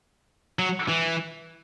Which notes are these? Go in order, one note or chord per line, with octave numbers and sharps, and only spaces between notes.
F#3
E3